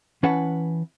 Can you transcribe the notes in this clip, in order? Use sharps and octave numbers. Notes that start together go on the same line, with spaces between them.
E3 C#4 B4 F#5 A5